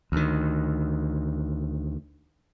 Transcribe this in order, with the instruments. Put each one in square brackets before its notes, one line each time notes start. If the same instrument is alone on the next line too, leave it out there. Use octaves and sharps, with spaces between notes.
[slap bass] D2 D#3